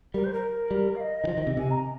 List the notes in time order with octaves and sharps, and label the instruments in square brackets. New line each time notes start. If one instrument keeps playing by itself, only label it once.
[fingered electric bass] G3 [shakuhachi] A#4
[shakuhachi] C5
A#4
[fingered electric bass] G3
[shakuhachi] F5
D#5
[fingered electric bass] D#3
F3
D#3
C3
[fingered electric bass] C3 [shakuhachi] G#5
[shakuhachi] A#5